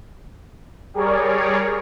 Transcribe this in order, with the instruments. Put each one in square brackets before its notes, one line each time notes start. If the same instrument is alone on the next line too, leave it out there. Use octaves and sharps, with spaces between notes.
[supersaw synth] G3 G#4 A#4 C#5 D5